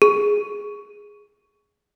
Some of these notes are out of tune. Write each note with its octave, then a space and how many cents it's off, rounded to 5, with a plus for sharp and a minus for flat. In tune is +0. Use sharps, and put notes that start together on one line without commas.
G#4 -5